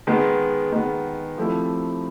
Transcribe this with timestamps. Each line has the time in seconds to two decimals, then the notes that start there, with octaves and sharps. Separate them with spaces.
0.07 D#3 G#3 B3
0.72 D#3 G#3 B3
1.37 F3 A3 C4 E4 G4